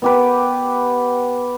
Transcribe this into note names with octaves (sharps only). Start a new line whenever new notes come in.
B3 G4 B4